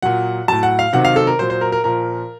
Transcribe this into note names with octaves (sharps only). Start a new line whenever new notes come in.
A#2 F#3 F#5
A2 F#3 A5
F#5
F5
C3 D#3 F#3 F#5
F5
A4
A#4
A#2 F#3 C5
C5
A#4
A#4
A#2 F3 A#4